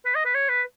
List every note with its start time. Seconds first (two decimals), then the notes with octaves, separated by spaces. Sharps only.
0.05 B4
0.15 D#5
0.25 B4
0.34 C#5
0.49 B4